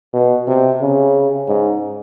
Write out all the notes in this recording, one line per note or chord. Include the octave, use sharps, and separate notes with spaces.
B2
C3
C#3
G#2